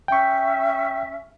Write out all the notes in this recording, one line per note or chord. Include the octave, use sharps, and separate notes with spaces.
C#4 E5 G5 C#6